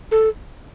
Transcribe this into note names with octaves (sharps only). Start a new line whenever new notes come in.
A4